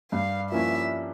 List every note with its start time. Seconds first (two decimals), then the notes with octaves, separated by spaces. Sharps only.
0.12 G2 F5
0.51 F3 A#3 C#4 E4 E5